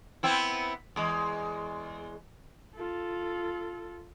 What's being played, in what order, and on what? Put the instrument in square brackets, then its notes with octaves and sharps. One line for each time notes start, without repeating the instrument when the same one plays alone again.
[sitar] B3 C4 E4
E2 G#3
[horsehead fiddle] F4 A4